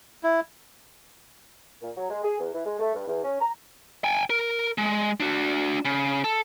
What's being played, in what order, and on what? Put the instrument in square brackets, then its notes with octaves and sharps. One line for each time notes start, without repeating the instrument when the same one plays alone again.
[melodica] E4
[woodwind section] A#2
F#3
G#3
G#4
E2
E3
G#3
A3
G2
E2
C#4
A#5
[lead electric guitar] G5 G#5
A#4
G#3
D4 F#4
C#3
A4